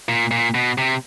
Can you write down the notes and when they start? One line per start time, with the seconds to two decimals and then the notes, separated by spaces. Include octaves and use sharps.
0.09 A#2
0.31 A#2
0.55 B2
0.78 C3